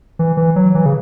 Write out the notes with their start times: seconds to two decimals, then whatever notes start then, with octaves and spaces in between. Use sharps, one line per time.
0.19 E3
0.37 E3
0.56 F#3
0.75 E3
0.86 C#3